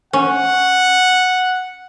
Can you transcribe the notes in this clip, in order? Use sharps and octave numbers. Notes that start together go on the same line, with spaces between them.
C#4 F#5